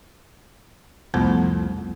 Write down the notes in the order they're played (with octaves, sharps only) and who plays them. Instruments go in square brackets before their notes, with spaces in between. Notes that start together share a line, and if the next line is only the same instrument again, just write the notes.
[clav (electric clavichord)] C2 F2 [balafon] A3 B3 C5